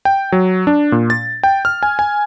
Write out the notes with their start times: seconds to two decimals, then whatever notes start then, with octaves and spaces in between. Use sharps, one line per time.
0.05 G5
0.32 F#3
0.67 D4
0.92 A#2
1.10 A6
1.44 G5
1.65 F6
1.83 G#5
1.99 G#5